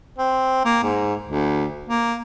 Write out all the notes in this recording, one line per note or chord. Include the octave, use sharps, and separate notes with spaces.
C4
A#3
G#2
D2
A#3